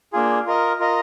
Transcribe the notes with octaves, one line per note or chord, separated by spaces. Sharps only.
A#3 D4 F4 G#4
F4 A#4 D#5
F4 A#4 D#5